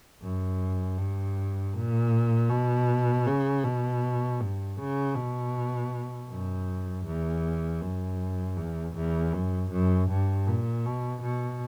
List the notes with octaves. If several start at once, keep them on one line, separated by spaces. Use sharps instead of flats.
F#2
G2
A#2
B2
C#3
B2
G2
C#3
B2
F#2
E2
F#2
E2
E2
F#2
F#2
G2
A#2
B2
B2